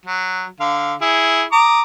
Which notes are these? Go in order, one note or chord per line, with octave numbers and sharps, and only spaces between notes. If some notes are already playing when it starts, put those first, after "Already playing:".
F#3
D3 F5
E4 G#4
A#5 D6 D#6